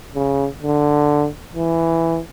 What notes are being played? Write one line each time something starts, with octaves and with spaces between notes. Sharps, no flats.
C#3
D3
E3